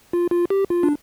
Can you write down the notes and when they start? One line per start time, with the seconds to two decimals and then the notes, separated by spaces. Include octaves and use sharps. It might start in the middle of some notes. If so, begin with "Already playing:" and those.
0.13 F4
0.31 F4
0.50 G4
0.70 F4
0.83 D4